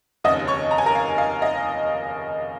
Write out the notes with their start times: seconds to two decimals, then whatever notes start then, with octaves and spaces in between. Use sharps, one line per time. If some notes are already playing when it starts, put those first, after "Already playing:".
0.24 F1 D#2 C#3 D#5 D#6
0.47 C#5 C#6
0.71 A#5
0.78 G#5
0.86 A#4 A#5
0.95 F5
1.18 F5
1.42 D#5